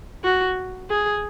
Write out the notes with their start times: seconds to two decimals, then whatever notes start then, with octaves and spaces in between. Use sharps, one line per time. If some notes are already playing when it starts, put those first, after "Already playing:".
0.24 F#4
0.90 G#4